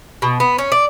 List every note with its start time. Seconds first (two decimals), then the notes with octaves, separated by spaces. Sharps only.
0.22 B2
0.40 B3
0.58 C#4
0.72 D5